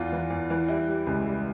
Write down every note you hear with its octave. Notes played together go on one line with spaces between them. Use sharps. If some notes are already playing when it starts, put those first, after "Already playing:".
Already playing: E2 F4
E3
E2
E3
G3 E4
G3
C#2
G3